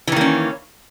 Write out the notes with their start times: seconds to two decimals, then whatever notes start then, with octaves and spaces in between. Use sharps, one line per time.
0.07 E3
0.12 D#3
0.16 A#3
0.21 C#4